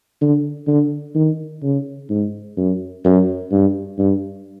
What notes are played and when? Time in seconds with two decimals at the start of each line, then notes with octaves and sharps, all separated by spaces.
0.21 D3
0.68 D3
1.15 D#3
1.63 C#3
2.10 G#2
2.57 F#2
3.05 F#2
3.51 G2
3.99 G2